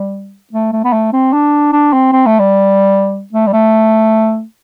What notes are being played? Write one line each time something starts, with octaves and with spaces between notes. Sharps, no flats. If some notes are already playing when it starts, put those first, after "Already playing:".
Already playing: G3
A3
A3
B3
A3
C4
D4
D4
C4
C4
A3
G3
A3
G3
A3